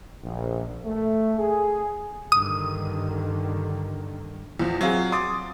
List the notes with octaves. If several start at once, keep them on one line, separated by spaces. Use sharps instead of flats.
A#1
A3
G#4
G2 D3 D#3 D#6
E2 F3
F#3 C4 F4 G#4
C6 D6 D#6 A6